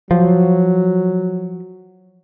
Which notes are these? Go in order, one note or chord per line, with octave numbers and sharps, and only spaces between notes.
F3 F#3